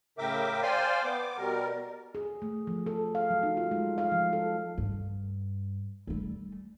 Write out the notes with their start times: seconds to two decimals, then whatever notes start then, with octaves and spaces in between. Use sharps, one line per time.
0.18 A2 C#3 A#4 E5 G5 D6
0.62 C5 D5 F5 G5 G#5 C6
1.04 B3 D6
1.37 B2 G3 A#4
2.15 G#4
2.42 A3
2.67 F3
2.86 A4
3.15 F5
3.30 F#3
3.43 D#4
3.57 F4
3.71 G#3
3.98 F5
4.12 F3
4.33 A4
4.78 G2
6.07 G3 A3